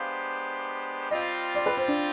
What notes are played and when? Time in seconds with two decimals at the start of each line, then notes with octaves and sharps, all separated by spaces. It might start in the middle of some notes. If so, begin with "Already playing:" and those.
Already playing: G#3 B3 D4 G4 C5 F5
1.10 G3 C4 F4 D#5
1.55 D5
1.66 B4
1.77 C5
1.88 D4